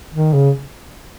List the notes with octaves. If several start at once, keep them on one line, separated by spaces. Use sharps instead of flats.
D#3
C#3